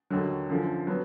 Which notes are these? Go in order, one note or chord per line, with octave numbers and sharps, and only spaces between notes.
D#2 D3 F#3
F#2 D3 F3
F#3 B3